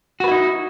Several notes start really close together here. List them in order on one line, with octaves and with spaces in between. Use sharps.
F#4 B4 E4 D#4